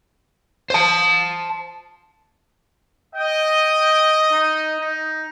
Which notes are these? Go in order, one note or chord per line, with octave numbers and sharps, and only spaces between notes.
C5 A5
D#5 G5
D#4
D#4